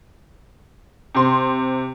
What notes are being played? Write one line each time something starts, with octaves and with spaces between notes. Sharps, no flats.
C3 C6